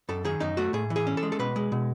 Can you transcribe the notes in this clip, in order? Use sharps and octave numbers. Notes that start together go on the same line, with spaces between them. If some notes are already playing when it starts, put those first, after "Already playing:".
F#2 A4
D#3 G#4
F#2 D#4
A3 F#4
A2 G#4
E3
G#4
C#4
A4
G#3
A4
B2 B4
G#3
B2